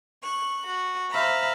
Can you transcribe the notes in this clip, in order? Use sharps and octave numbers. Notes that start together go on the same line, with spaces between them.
C#6 F#6
F#4
C5 E5 F5 A#5 B5